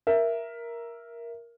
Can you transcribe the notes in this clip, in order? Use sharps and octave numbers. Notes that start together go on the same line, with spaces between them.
A#4 E5